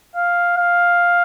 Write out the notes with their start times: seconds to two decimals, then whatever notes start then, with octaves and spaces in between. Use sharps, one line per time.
0.16 F5
0.57 F5